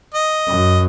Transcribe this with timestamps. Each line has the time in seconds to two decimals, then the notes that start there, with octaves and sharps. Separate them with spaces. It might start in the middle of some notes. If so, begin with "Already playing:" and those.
0.14 D#5
0.47 F#2